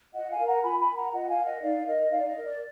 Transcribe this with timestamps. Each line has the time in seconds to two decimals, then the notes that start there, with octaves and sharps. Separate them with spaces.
0.13 F4 D#5 F#5
0.30 F5 G#5
0.38 A#4
0.46 F#5 A#5
0.63 F4 G#5 B5
0.79 G#5 B5
0.88 A#4
0.96 F#5 A#5
1.12 F4 D#5 F#5
1.29 F5 G#5
1.37 A#4
1.45 D#5 F#5
1.62 D#4 D5 F5
1.87 A#4 D#5
2.11 D#4 D5 F5
2.27 D#5
2.35 A#4
2.44 D5